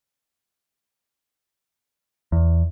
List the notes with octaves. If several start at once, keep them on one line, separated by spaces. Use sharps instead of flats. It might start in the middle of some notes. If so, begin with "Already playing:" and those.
E2